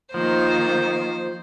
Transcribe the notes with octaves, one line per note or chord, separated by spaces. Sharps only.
D#3 F3 A#3 C5